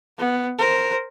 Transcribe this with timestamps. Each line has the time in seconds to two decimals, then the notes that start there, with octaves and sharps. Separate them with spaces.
0.18 B3
0.58 A#4 C5